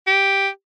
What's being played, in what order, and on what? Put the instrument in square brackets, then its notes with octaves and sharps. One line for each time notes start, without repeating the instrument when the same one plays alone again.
[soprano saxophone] G4